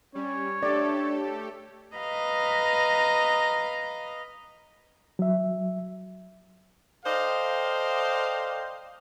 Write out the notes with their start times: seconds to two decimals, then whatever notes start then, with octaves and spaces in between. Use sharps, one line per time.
0.15 G3 C#4 C#5
0.63 A3 D4 G4 A4 D5
1.96 B4 D#5 F5 A#5
5.19 F#3 E5
7.06 A4 C5 D5 D#5 F5 G5